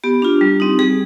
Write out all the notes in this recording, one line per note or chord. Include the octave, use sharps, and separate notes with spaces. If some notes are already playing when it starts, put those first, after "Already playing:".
B3 G4
D4 F4
G3
C4 D#4
G3 G#4